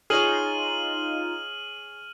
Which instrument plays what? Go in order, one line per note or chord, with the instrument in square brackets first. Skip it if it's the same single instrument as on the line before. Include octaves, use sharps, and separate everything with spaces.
[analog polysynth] D#4 F4 [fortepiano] G#4 C#5 [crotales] F6 D#7 F#7